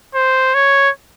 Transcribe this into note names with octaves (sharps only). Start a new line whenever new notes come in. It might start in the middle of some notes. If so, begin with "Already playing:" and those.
C5
C#5